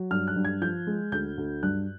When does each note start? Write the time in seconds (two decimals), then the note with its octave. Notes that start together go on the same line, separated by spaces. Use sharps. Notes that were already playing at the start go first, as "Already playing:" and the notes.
Already playing: F#3
0.11 G2 F6
0.28 F#6
0.36 G2
0.45 G#6
0.61 F3 G6
0.87 G#3
1.12 D2 G6
1.38 D2
1.63 G2 F#6